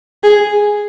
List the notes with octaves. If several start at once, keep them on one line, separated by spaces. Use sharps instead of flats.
G#4